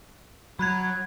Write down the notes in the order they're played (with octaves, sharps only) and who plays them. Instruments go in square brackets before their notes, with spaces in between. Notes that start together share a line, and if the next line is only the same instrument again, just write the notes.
[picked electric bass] F#3 [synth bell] B5 F#6 G#6